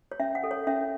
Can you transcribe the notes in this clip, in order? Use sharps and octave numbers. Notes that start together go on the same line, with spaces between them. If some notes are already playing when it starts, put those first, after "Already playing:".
C#5
C#4 E5
F#5
A4
C#5
C#4 E5